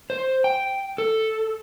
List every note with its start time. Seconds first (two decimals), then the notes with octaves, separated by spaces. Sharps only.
0.10 C5
0.44 G5
0.98 A4